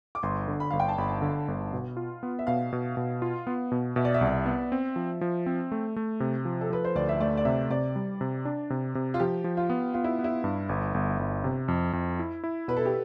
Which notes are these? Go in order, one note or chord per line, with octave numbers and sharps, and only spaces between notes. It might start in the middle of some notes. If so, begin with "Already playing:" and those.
D6
G1 C6
D3
B5
G1 F5
G5
A5
G1 B5
D3
G1
B2
F4
B3
E5
B2 F5
B2
B2
F4
B3
B2
B2 E5
D5
E5
C2
B3
C4
F3
F3
C4
A3
A3
C3
F3
A4
F3 B4
C5
D2 D5
E5
A3 D5
D5
C3 E5
C3 D5
G3
C3
D4
C3
C3
F4
F3 G4
F3
F4
B3
B3 F4
E4
B3
E4
G2
G1
G1
G1
C3
F2
F2
E4
E4
B2 B4
A4
G4